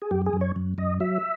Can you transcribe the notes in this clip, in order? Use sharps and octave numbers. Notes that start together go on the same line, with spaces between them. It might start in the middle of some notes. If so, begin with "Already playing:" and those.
G#4
F#2 G4
G#4
F#2
C#5
F#2
F#2 D#5
F#3 E5